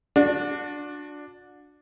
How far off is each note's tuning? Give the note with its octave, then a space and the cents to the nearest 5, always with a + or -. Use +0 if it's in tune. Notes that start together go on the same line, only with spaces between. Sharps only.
D4 +0 F#4 -35